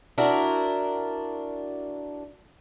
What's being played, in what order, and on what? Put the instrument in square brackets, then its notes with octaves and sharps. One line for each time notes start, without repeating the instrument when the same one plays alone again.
[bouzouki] D4 E4 F#4 A#4